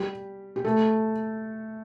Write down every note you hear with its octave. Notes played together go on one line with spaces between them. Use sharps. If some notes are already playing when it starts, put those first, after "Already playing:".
Already playing: G3 G4
G4
A3 A4